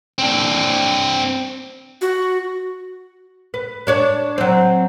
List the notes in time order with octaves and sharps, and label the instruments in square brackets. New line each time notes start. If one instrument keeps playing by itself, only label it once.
[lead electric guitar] C4 D4
[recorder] F#4
[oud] B4
D4 C#5 D5
F#3 C4